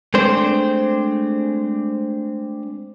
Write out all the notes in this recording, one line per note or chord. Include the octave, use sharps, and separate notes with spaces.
G#3 A3 C4 D4 C5